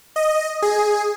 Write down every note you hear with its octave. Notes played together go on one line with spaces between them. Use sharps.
D#5
G#4